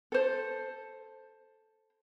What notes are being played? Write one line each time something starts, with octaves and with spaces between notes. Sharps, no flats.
A4 C5